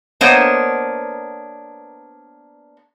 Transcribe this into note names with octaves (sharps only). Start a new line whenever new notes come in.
A#3 B3 D4 C5 C#5 D#5